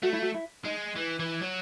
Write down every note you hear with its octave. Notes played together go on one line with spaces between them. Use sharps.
A3 F#4
E4
F#4
E4
G#3 D#4
E3
E3
F#3